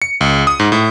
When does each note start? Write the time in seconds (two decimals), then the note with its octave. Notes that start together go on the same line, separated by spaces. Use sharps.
0.02 C#7
0.21 C#2
0.47 D#6
0.60 G#2
0.72 A2